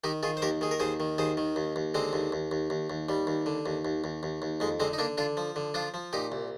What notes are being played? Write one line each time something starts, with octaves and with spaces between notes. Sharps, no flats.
D#3 D#4 G4
D#3 F4 G#4
C5
D#2 G4 A#4
D#3 G#4
A#4
D#2 G#4 C5
D#3
D#2 G#4 C5
D#3
D#2
D#2
D3 G#3 C4
D#2
D#2
D#2
D#2
D#2
D#2 G3
D#2
D3
D#2
D#2
D#2
D#2
D#2
F2 G#3
D3 G#3 C4
D#4
D3 A#3 D4
D3 D4 F4
F3
D3
F3 D4 F4
F3
A#2 D#4 G4
C2